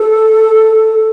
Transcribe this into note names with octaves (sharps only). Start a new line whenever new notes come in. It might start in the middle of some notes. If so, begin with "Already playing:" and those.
Already playing: A4